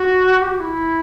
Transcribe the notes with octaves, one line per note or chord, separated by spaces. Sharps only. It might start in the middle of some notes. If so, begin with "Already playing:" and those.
Already playing: F#4
G4
F#4
E4